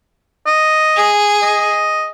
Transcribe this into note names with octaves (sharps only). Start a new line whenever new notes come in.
D#5
G#4
D#5